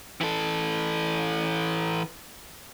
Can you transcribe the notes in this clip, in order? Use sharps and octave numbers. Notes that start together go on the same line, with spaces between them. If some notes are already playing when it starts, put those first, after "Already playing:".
E3 A4